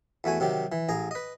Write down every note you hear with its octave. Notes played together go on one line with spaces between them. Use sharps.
E2 A3 F#4 G#5
C3 D#3 F#3 G4
E3
A1 G#4 A#5
B4 D#5